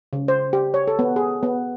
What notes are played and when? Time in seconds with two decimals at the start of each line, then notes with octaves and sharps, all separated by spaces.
0.13 C#3
0.28 C5
0.53 G4
0.74 C#5
0.88 A4
0.99 B3
1.16 G#4
1.43 B3